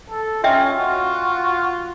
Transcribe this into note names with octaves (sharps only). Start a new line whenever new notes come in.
A4
C#4 F4 D#5 E5 G5
F4 F#4